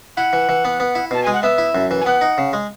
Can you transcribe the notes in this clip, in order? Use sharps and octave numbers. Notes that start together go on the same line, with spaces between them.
E4 F#5
E3
E3
B3
B3
E4
B2 A5
G#3 G#5
F#5
B3 E5
E4
F#2
E3
G#5
B3 F#5
D#4
C#3
G#3